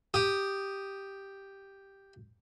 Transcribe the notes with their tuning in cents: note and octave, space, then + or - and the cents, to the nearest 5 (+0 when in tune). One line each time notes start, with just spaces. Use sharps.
G4 +0 D#6 -5